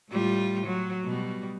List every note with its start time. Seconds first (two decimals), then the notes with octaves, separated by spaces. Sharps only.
0.10 A2 G3 F4
0.66 F#3
1.04 B2 G3